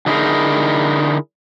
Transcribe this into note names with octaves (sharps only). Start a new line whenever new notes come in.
D3 D#4 E4 F#4 G#4 A#4